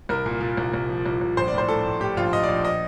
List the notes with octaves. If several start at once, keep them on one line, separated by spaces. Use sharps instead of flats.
C2 A#4
A#2
A#2
C2
C2
F3
C2
C2
A#1 C5
D5
A2
C5
A2 A4
A2
A2 G4
A#1 F4
A#1 D#5
A#1 D5
D#5